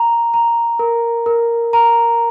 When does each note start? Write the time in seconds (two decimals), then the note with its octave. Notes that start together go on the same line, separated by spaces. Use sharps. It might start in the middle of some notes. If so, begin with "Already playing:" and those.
Already playing: A#5
0.34 A#5
0.79 A#4
1.26 A#4
1.73 A#5